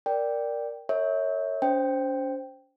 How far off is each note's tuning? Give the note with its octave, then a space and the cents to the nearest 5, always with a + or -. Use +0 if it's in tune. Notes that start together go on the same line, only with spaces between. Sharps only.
A#4 +0 D5 +0 G5 +0
A#4 -35 C#5 +0 E5 -35
C#4 +45 C5 +0 G5 +0